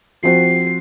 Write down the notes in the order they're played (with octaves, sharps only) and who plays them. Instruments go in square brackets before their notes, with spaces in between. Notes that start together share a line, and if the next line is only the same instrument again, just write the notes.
[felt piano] F3 C4 F#4 [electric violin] C7